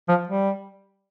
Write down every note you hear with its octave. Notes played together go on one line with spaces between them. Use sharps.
F3
G3